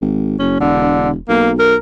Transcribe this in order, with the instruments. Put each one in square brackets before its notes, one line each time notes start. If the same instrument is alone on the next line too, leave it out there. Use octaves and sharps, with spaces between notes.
[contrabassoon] G#1
[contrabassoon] F#1 [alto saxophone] C#4
[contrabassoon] E1 [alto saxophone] D3
[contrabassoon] B1 [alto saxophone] A#3
[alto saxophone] A#4